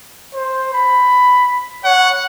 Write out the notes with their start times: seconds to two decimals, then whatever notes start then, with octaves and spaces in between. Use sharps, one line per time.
0.34 C5
0.74 B5
1.84 C#5 F#5